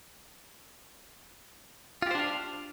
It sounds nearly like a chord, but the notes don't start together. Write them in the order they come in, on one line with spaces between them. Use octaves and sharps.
F4 G4 C5 D4 F5